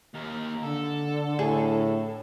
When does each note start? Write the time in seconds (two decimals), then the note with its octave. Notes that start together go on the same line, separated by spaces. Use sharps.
0.14 D#2 A#4
0.63 D3 A4
1.39 A2 G#4